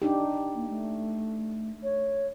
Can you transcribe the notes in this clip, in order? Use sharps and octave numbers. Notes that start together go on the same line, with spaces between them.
D4 D#4 G4
A#3
A3
C#5